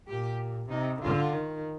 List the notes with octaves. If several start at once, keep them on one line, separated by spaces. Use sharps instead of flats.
A#2 G4
C3 D#4
D3 F4
D#3